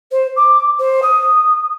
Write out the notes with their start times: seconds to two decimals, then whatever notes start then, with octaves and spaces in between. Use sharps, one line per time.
0.11 C5
0.36 D6
0.79 C5
1.02 D#6